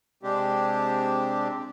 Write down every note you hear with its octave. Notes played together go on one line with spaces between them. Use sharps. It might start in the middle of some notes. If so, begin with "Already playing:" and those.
C3 G#3 C4 D4 G4